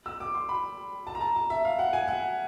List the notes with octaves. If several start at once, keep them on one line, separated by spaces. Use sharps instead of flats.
E6
D6
C6
B5
A5
A#5
A5
A5
E5
F5
F#5
G#5
F#5